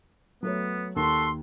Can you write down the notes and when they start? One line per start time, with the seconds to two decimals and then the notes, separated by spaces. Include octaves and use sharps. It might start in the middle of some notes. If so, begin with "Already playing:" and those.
0.43 F#3 A3 B3 C#5
0.96 D#2 F#4 A4 C6